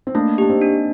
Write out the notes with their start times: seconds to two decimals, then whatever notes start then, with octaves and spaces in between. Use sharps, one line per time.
0.07 C4
0.15 A3 A#3 D4
0.38 D4 G4
0.49 C4 D#4
0.62 D4